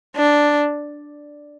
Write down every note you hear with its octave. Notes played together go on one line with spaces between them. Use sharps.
D4